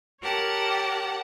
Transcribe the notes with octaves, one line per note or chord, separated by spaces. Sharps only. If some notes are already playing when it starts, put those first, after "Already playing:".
G4 A#4 C#5 F#5 A5